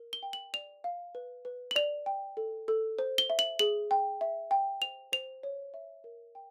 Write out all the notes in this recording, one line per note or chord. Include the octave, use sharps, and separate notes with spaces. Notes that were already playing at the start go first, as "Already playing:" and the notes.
Already playing: A#4
G7
G5
F#7
D5 F7
F5
B4
B4
F#7
D5 F7
G5
A4
A4
C5
G7
E5
F#7
G#4 F#7
G5
E5
G5
C5 F7
C5 F7
C#5
E5
A#4
G5